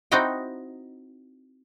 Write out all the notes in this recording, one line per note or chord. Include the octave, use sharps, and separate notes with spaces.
C4 D#4 E4 F#4 D#5 G5